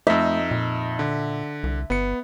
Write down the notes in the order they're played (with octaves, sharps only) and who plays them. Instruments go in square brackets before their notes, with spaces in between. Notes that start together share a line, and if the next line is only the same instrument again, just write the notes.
[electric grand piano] F2 D#4 [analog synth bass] A3 [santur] E5
[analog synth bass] A#2
[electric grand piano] D3
[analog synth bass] C2
[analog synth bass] G1 [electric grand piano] B3 C#7